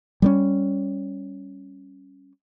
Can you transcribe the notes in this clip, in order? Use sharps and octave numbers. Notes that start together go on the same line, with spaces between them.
G3 A3 C#4